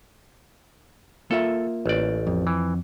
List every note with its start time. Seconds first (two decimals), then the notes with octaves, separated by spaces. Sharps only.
1.31 A#3 F4 A4 E5
1.86 A1 D5
2.27 F2
2.47 E3